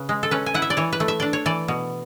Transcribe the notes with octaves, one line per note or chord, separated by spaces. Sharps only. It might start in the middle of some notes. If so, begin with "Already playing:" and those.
Already playing: C#3 B4
G#3
A4
C#4 B4
G#5
E4 F#5
E5
D5
E3 C#5
B4
A3
E5
D4 D5
C#5
E3 D5
B2